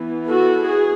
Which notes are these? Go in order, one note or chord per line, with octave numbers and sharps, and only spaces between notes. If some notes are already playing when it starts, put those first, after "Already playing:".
Already playing: E3 B3
F#4 A4
G#4